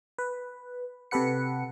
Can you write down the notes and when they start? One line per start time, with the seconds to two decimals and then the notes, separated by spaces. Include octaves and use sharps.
0.18 B4
1.11 C3 G4 A4 B4 F#5 C#7